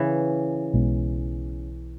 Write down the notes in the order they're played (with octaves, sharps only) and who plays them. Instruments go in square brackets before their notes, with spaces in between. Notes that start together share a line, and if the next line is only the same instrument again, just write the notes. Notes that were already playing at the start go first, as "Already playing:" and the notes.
Already playing: [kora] C#3 E3
[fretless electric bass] B1 B2 G#3 B3